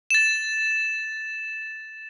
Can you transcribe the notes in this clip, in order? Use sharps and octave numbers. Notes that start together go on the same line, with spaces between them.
A6 E7